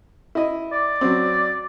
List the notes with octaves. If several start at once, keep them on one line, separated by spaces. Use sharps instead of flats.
E4 D#5
D5
F#3 C4